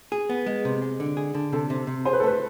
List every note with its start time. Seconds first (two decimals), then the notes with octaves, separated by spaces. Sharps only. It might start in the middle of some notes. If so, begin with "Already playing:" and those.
0.12 G#4
0.29 B3
0.46 G#3
0.65 C3
0.82 G#3
1.00 D3
1.17 G#4
1.35 D3
1.52 C3 A4
1.70 C3
1.87 C3
2.05 G#4 C5
2.13 B4
2.20 A4
2.23 A3 B4